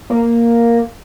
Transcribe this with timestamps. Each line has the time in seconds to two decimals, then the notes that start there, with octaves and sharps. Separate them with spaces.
0.10 A#3